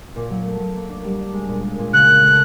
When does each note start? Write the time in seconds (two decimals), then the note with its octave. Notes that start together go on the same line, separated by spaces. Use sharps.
0.16 A#2
0.30 F#3
0.45 A3
0.60 F#3
0.75 A#3
0.89 D4
1.04 G3
1.19 D4
1.34 G#3
1.48 A#2
1.64 G#3
1.78 A#2
1.93 C#3 F#6
2.08 C#4
2.23 A3